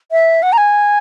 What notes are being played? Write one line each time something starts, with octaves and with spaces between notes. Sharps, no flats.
E5
F#5
A#5
G#5